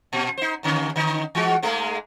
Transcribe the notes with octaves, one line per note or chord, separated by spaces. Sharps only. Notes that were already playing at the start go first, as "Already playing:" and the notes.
A#2
D#4 C5
D#2 D3 C#4
D3 D#4
E3 G#3 F#4
G#2 G#3 A3